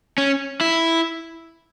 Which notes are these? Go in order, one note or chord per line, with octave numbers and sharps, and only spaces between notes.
C#4
E4